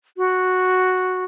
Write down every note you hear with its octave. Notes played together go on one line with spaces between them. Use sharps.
F#4